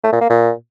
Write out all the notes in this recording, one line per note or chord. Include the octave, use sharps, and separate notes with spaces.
A3
A#2
A#3
A#2